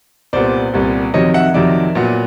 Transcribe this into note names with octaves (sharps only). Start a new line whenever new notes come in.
C2 A#2 G3 B3 C5 D5
C2 A#2 G3 B3
F2 C3 D#3 F#3 C#5 D#5
E5 F#5
F2 C3 D#3 F#3 D5 E5
A#2 F#3 B3